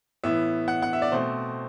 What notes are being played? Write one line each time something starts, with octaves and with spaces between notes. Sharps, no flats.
A2 E3 B3 E5
F#5
F#5
E5
D5
B2 A3 C4 C5